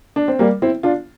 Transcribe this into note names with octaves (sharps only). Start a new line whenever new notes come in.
D4
C4
G3 A#3
C4 E4
D4 F4